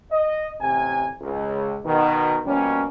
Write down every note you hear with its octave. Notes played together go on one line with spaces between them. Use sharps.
D#5
A1 C3 G#5
C#2
B2 D#3
B2 F3 G3 A#3 C#4